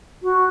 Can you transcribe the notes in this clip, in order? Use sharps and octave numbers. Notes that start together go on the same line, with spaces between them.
F#4